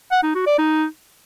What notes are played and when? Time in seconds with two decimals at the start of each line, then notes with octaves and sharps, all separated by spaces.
0.12 F#5
0.23 D#4
0.35 F#4
0.47 D5
0.58 D#4